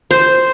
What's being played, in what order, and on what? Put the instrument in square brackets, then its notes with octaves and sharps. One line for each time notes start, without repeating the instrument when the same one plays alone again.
[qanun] C5